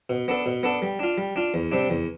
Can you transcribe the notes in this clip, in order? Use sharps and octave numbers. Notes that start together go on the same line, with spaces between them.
B2
B3 D4 A4
B2
B3 D4 A4
G3
D4 F4
G3
D4 F4
E2
C3 G3 D4
E2